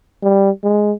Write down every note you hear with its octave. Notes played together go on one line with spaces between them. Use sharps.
G3
G#3